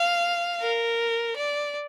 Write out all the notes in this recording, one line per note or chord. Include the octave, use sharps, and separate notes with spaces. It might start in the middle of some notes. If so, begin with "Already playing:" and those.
Already playing: F5
A#4
D5